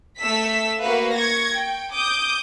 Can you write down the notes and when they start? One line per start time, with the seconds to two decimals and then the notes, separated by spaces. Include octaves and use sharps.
0.19 A3 E6 B6
0.82 A#3 F#4 B4 F5
1.17 C#6 G#6 A#6
1.58 G5
1.95 D6 D#6 G6